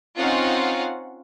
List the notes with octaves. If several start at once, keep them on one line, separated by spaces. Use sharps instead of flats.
C4 C#4 D#4 F4 F5 F#5